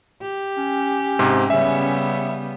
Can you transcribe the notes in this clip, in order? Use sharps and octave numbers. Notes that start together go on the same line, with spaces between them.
G4
C#4
G#2 C3
C#3 G3 B3 E5